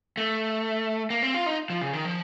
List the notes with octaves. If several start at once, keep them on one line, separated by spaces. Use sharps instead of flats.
A3
A#3
C4
F4
D#4
F3
C#3
D#3
F3